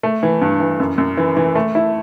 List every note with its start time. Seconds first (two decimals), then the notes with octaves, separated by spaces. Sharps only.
0.03 A3
0.23 E3
0.41 G2
0.60 E3
0.80 F#2
0.98 F#2
1.17 E3
1.37 E3
1.55 A3
1.75 E4